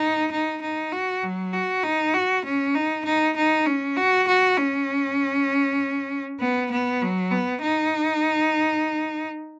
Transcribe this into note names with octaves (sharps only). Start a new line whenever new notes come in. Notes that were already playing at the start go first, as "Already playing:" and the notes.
Already playing: D#4
D#4
D#4
F#4
F#3
F#4
D#4
F#4
C#4
D#4
D#4
D#4
C#4
F#4
F#4
C#4
B3
B3
F#3
B3
D#4